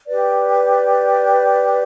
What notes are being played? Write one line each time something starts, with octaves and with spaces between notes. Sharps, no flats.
G4 B4 D5